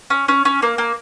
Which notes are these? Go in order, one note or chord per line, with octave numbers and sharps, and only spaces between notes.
C#4
C#4
C#4
A#3
A#3